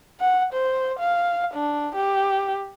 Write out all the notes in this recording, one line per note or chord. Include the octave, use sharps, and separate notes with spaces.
F#5
C5
F5
D4
G4